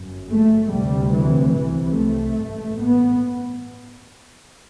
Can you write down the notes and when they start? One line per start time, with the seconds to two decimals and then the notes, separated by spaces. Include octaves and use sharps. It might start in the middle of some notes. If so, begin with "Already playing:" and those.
Already playing: G1 F#2
0.29 A3
0.71 D2 C3 G3
1.13 E3
1.55 C2 C3 E3
1.97 A3
2.39 A1 G2
2.81 B3